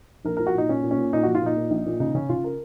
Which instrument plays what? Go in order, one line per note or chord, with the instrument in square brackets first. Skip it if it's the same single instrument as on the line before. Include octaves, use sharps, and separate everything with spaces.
[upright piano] A#1 A#4
F3 A#4
F#4
A#2 D#4
A#2 C#4
A#2
C#4
A#2
A#2 D#4
F3 F#4
F4
A#2 D#4
A#2
A#1
A#2
C#3 D#4
C#3 C#4
C#3 F4
A#4